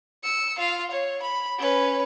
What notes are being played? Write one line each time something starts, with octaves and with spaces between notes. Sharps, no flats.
E6 C#7
F4 F5
C#5
B5
C#4 B4